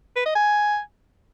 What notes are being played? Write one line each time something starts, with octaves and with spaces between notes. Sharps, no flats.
B4
D#5
G#5